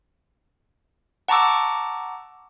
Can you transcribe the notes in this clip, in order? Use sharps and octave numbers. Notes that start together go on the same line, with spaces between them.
F#5 A5 A#5 C#6 D6 E6